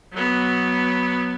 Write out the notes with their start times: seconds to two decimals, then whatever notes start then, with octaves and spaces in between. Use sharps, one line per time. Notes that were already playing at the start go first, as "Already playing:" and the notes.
0.12 F#3 B3